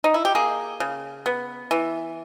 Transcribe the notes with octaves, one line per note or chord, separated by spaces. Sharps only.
D#4
E4
G4
A#3 G#4
C#3
B3
E3